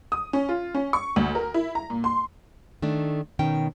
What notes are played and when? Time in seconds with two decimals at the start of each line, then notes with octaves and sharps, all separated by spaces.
0.12 D#6
0.33 C#4
0.49 F4
0.75 C#4
0.93 C#6
1.16 D2
1.35 A#4
1.54 E4
1.75 A#5
1.90 A#2
2.04 C6
2.82 D#3 A3 D4
3.39 B2 D#3 C#4 G5